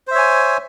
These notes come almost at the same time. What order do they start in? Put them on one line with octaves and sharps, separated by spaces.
C5 E5 C#5 G#5